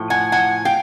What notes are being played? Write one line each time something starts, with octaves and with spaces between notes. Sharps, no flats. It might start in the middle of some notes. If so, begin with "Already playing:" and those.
Already playing: A2 F3
F#5 G#5
F#5 G#5
F5 G5